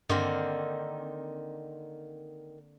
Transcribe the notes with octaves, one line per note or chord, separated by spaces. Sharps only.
G2 D3 D#3 A#3 C4 C6